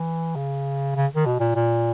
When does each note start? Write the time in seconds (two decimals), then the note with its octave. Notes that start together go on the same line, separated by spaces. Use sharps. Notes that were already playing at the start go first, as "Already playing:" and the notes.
Already playing: E3
0.36 C#3
0.95 C#3
1.15 D#3
1.26 B2
1.40 A#2
1.55 A#2